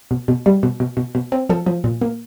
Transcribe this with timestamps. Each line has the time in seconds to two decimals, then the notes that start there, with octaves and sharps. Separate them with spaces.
0.11 B2
0.28 B2
0.46 G3
0.63 B2
0.80 B2
0.97 B2
1.15 B2
1.32 C4
1.49 F3 A4
1.66 F3
1.84 A#2
2.01 A#3